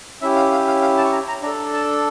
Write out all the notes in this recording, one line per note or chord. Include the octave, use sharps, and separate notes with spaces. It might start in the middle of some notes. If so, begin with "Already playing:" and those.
C#4 E4 G4 E5
F5
F5
F5
F5
A5
C#6
A#5
A#5
D4 A4 A#5
A5